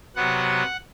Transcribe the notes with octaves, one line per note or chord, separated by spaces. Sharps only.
C3 F#3 B3 F#5